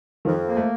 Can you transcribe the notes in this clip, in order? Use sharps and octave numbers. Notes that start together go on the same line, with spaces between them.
F2 D#3 F3
A#3
A3